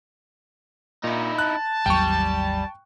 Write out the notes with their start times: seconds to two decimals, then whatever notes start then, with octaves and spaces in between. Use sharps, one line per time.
1.04 A#2 D#4 E4
1.39 A5 F#6
1.86 G#1 D#2 F#3 G3 G5 C#6